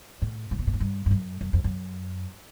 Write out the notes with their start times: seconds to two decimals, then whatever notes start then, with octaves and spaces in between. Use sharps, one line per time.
0.22 A2
0.51 G#2
0.59 A#2
0.67 A2
0.74 G#2
0.80 G2
1.06 G2
1.11 F#2
1.41 F#2
1.53 F2
1.64 F#2